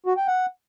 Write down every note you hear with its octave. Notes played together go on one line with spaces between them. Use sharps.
F#4
G5
F#5